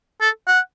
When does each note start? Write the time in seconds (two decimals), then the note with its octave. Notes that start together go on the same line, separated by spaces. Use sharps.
0.21 A4
0.47 F#5